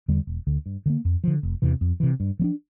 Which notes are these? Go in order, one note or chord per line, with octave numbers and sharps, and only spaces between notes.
E2 D3 G3
E1
D2 D3
G2
D3 F3 A#3
F2
D3 F3
F1
E2 C3 E3
F2
C3 E3
G2
F3 A#3 D4